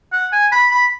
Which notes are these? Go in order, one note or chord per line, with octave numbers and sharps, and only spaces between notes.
F#5
G#5
B5
B5